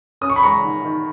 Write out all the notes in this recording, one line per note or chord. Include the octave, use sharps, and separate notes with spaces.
C#4 D#6
C#6
B5
G#3 A#5 C#6
D#3
D#3